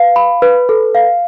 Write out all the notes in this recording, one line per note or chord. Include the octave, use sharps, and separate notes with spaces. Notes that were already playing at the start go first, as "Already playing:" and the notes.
Already playing: B4 F5
B5
B4
A4
F5